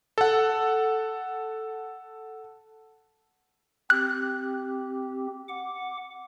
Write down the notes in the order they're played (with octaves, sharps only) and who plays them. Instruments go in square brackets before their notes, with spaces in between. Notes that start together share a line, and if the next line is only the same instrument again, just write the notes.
[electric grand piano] A4 F#5
[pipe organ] C4 G4 [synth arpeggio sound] F#6
[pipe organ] F#5 D6